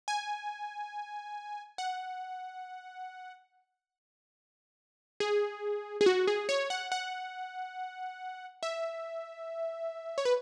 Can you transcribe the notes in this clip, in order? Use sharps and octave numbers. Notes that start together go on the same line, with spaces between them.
G#5
F#5
G#4
G#4
F#4
G#4
C#5
F#5
F#5
E5
C#5
B4